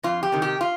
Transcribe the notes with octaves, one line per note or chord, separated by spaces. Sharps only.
F2 F4
G4
C3 D#3
G4
F4